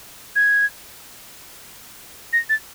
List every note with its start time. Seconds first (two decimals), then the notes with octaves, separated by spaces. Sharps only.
0.36 G#6
2.33 A#6
2.49 A6